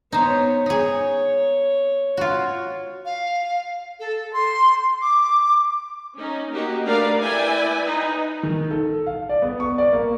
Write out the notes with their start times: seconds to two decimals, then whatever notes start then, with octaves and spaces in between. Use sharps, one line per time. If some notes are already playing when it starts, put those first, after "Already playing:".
0.12 B3 D#4 C5 C#5
0.66 D#4 G#4 C#5
2.17 F4 F#4
3.05 F5
3.99 A4
4.33 C6
5.01 D6
6.17 C#4 D#4
6.51 A#3 D#4 F#4 G4
6.84 A3 D4 A#4 B4 D5 F5
7.22 E4 B4 D5 G5 G#5
7.83 D#4 B4
8.43 D#3
8.71 A4
9.06 F5
9.29 D5
9.42 B3
9.60 C#6
9.78 D5
9.93 A#3